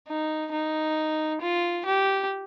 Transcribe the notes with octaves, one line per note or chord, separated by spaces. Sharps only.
D#4
D#4
F4
G4